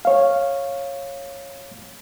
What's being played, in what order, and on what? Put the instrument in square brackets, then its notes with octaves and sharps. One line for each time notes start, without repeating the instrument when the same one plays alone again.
[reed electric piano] C#5 F5